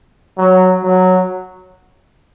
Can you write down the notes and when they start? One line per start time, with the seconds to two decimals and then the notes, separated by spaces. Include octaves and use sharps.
0.38 F#3
0.83 F#3